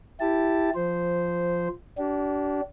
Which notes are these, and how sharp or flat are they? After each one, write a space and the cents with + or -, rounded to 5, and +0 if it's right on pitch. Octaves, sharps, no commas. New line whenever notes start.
E4 +0 G4 +0 A5 +0
F3 +0 C5 -10
D4 -25 G4 -45